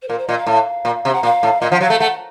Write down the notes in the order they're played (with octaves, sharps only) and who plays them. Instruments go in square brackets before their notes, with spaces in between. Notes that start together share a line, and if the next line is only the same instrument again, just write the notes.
[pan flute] C5
[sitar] A#2 [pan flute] A#4
[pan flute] C5
[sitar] A#2 [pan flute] D#5
[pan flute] F5
[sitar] A2
A#2
C3
[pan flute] F#5
[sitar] A#2 [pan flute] F5
[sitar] A2
[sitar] A#2 [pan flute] D#5
[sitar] F3 [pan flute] F#5
[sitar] F#3 [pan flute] F5
[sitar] A3
[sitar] A3 [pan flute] F#5